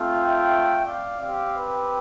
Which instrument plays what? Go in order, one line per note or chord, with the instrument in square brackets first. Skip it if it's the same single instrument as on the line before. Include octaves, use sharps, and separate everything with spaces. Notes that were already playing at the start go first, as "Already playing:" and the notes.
Already playing: [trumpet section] A3 C4 F4
E5 G5
D5 F5
C4 G4 D5 F5
G4 B4